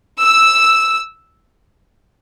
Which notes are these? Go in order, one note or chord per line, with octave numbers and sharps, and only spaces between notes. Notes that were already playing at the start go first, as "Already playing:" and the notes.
E6